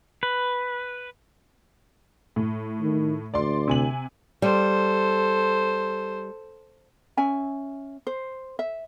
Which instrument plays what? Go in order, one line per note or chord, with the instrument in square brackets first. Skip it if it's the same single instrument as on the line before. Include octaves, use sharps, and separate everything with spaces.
[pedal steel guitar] B4
[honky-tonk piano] A2
[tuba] D#3
[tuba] D2 [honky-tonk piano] D5 C6
[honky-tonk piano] C3 G#5 F#7
[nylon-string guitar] G3 [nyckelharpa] A4 C5
[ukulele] C#4 E5 G#5
C5
E5